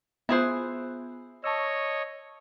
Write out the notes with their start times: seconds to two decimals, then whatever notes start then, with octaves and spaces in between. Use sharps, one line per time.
0.29 B3 E4 F4 G#4 C5 F#6
1.44 C#5 D#5 A5 C#6 E6